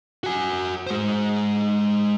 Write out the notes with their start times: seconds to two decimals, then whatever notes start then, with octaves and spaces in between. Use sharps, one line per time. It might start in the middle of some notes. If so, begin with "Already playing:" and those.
0.24 F#4 G#5
0.87 G#3 C5